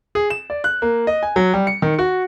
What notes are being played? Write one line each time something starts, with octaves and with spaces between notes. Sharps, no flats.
G#4
E7
D5
F#6
A#3
D#5
G#5
F#3
G3
C#7
D#3
F#4